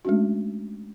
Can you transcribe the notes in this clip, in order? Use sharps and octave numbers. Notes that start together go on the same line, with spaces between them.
G#3 A3 C#4 D4 F#4